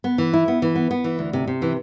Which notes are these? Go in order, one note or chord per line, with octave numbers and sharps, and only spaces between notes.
B3
E3
E4
B3
E3
B3
B3
E3
D2
C3
C3
E3